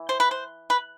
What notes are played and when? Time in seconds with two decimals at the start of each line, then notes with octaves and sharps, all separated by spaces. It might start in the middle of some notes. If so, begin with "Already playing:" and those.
Already playing: E3
0.09 C5
0.20 B4
0.31 C5
0.70 B4